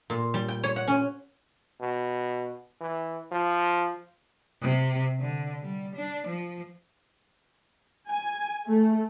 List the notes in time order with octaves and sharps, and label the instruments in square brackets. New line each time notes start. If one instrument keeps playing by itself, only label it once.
[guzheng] A#2
G3
G5
C#5
F#5
C#4
[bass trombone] B2
E3
F3
[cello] C3
D3
G3
D4
F3
[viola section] G#5
A3